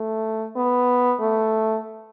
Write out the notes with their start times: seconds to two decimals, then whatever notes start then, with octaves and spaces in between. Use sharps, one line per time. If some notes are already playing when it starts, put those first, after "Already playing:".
Already playing: A3
0.56 B3
1.20 A3